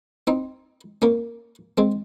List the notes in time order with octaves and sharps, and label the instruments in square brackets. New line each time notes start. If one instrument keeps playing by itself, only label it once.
[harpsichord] C4 D#4
A#3 C#4
G#3 C4